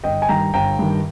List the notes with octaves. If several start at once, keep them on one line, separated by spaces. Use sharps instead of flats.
G1 D#5 G5
G#5
G2 D#3 G5 A#5
G1 G5 A#5
G2 D#3